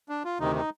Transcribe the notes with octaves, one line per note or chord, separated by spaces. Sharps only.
D4
F4
D2 C3 D#3 D#4
D#4